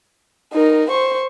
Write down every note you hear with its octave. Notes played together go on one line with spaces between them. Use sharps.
D#4 A#4
C5 C#6